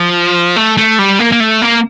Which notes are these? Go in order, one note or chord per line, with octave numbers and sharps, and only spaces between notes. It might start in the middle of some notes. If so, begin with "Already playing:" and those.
Already playing: F3
A3
A3
G3
A#3
A#3
A3
A#3